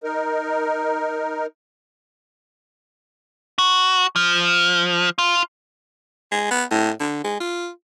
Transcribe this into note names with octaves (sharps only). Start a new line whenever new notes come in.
D#4 A#4
F#4
F3
F4
G#3
B3
A2
D3
G#3
F4